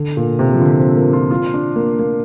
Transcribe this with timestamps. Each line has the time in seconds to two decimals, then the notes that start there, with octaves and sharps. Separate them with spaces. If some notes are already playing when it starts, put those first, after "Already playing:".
Already playing: D3
0.17 A#2
0.39 C3
0.54 F3
0.61 D3
0.79 C4
0.97 A#3
1.13 F4
1.31 F4
1.54 D4
1.76 A#3
1.99 A#3